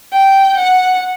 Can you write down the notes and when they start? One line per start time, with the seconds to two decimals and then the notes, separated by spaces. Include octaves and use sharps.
0.12 G5
0.57 F#5